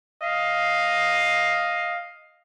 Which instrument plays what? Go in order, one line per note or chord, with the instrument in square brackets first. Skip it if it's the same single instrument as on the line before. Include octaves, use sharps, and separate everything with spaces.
[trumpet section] D#5 F5